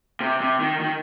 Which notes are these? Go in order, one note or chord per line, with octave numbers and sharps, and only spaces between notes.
C3
C3
D#3
D#3